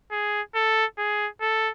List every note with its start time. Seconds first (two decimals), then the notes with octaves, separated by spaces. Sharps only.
0.11 G#4
0.55 A4
0.98 G#4
1.41 A4